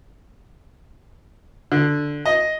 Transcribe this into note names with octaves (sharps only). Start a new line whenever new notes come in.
D3
D#5